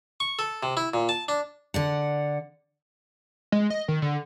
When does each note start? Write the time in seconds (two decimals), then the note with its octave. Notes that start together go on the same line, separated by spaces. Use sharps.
0.20 C#6
0.39 A4
0.63 C3
0.77 E4
0.94 A#2
1.09 A5
1.28 D4
1.74 D3 D5 F#5
3.52 G#3
3.70 D#5
3.88 D#3
4.02 D3